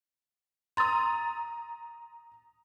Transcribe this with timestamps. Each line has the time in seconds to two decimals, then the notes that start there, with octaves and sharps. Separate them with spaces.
0.77 A#5 C6 D#6 A6